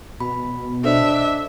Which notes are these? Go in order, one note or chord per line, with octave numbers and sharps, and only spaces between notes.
B2 B5
D4 A4 C5 D#5 E5